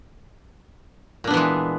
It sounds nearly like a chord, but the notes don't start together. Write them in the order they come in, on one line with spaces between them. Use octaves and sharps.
A#2 D4 B3 E3 G#3